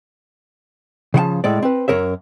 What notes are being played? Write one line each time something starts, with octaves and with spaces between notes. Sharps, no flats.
C#3 F3 F#5 A5
A2 G#3 D5
C4 B4
F#2 A#4 C#5 E5